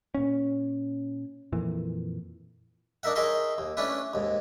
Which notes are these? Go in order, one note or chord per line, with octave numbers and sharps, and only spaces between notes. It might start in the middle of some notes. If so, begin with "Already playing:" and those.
A#2 C#4
F2 A#2 E3
D4 D#4 A#4 E5 F#5
D#4 G#4 A#4 C#5 E5 C6
D#2
A3 C#4 D4 E4 B4
D#2 G#2